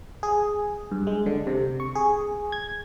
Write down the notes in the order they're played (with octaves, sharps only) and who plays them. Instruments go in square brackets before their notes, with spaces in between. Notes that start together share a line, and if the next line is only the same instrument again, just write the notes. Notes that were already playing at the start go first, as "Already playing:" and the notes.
[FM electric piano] G#4
G2
G#3
D3
C3
C#6
G#4
G#6